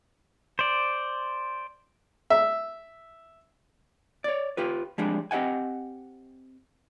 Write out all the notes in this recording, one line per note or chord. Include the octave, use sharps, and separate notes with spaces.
C5 D5
E5
C#5 D5
F4 G4 B4
F3 G3 G#3 D4
C4 G4 D#5 F#5 G#5